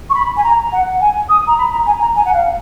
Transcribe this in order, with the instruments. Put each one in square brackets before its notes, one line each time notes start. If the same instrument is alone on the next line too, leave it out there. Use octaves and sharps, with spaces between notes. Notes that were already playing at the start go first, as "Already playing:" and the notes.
[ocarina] C#6
B5
G#5
A#5
F#5
F#5
G#5
D#6
A#5
B5
A#5
G#5
A#5
G#5
F#5
F5